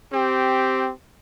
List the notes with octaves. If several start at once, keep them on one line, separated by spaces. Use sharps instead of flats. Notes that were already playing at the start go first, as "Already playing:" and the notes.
C4 G4